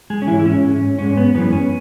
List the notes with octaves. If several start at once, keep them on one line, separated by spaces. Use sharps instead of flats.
G#3 G#4
C#4
G#2 E3 G#3 E4
E4
C#4
G#2 G#3
G#2 G#3 C#4
B3
F#2 E3 G#3 B3
C#4